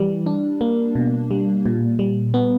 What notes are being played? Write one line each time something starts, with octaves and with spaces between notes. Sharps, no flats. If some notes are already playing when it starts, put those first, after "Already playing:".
Already playing: E3 G3
D4
A#3
B2
G3
A#2
G3
B3